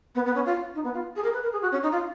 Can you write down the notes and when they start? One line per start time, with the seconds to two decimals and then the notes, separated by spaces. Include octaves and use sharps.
0.15 B3
0.26 B3
0.35 C#4
0.46 F4
0.75 D#4
0.84 B3
0.94 F4
1.16 G#4
1.24 A#4
1.33 B4
1.42 A#4
1.53 G#4
1.62 F#4
1.72 C#4
1.83 D#4
1.92 F4